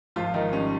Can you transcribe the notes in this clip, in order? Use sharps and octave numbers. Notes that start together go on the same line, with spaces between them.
G#1 F3 F4
D#3 D#4
G3 C#4